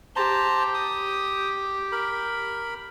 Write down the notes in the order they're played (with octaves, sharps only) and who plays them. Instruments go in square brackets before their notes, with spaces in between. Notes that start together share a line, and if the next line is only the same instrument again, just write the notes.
[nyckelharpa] G4 [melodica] C5 A5 A#5
[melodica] D#6
A#4 B5